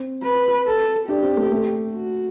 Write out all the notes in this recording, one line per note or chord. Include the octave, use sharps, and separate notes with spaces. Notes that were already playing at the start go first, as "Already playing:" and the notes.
Already playing: C4
B4
A4
D4 G4
C4
A3
A3
F#4